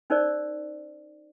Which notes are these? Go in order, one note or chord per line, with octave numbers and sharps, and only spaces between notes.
C#4 D#4 A#4 C5 D5